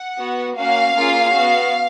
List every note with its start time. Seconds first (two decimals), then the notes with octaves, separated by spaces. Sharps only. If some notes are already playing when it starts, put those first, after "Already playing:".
Already playing: F#5
0.17 B3 F#4
0.56 A#3 C#4 F#4 F5
0.95 A#3 C#4 F4 G#4
1.33 B3 F#4